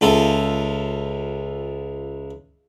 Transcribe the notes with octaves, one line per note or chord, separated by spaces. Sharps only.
C#2 F4 A4 E5 A#5